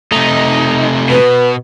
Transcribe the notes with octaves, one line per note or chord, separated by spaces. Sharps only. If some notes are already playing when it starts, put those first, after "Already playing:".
C3 A3 D#4
B2 B4